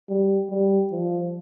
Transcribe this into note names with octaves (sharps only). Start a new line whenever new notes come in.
G3
G3
F3